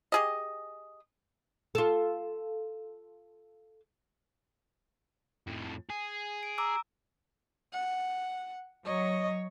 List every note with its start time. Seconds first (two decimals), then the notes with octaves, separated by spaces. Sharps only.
0.12 G4 G#4 D#5
1.75 F4 A4
5.47 F2 A2
5.90 G#4
6.43 D7
6.58 A#5 D6 E6
7.73 F#5
8.85 F#3 C#5 D#5